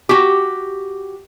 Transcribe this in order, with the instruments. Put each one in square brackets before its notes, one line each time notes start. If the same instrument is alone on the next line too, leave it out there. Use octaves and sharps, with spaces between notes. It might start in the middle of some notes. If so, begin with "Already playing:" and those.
[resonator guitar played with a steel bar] F#4 G4